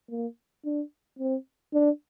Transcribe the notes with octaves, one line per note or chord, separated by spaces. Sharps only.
A#3
D4
C4
D4